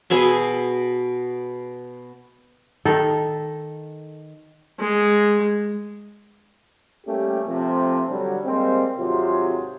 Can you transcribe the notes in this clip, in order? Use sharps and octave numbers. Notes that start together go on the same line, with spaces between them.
B2 G#4 E5 C6
D#3 A4
G#3
G3 A3 A#3 C#4 G4
C3 F3 A3 C4
D3 F#3 G3
G3 G#3 A#3 C4
G#1 C3 F#3 F4 G#4 C5